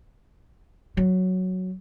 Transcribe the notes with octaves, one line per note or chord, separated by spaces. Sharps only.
F#3